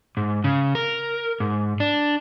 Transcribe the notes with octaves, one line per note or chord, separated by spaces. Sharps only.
G#2
C#3
A#4
G#2
D4